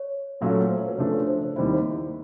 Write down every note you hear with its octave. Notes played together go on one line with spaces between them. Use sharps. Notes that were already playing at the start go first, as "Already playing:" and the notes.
Already playing: C#5
A#2 F#3 A3 C#4 F4
C5
C#5
B4
C#3 F3 A3 D4 C5
C#5
C5
C5
D#2 D#3 G3 C4 E4 C5